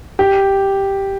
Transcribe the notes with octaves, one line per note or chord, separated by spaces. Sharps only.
G4